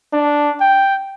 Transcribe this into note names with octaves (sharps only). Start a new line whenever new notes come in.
D4
G5